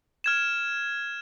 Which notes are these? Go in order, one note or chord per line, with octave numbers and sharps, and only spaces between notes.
F6 G#6 E7